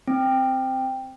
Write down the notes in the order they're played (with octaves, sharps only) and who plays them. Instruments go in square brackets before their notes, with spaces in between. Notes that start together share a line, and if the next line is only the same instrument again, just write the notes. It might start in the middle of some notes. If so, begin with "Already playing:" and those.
[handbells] C4